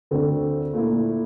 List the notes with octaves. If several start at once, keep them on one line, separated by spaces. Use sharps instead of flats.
D2 D3 A3 C4
A#2 A3 E4